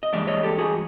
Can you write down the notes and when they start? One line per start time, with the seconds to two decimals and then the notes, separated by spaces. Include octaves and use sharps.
0.03 D#5
0.13 G2 E3 G#3 D5 E5
0.27 C#5 D#5
0.43 G4 A4
0.58 F#4 G#4